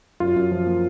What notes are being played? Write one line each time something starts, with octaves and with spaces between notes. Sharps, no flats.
F#2 F4
F#2
F3
A#3